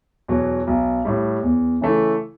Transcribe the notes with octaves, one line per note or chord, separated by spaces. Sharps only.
E2 B2 F#3
B1
A2 G3
E2
C#3 E3 A3 E4